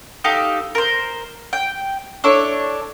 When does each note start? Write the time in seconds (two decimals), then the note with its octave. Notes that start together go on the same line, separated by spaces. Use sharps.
0.24 D#4 G4 A4 F5
0.75 A#4 C5
1.53 G5
2.24 D4 E4 A4 C#5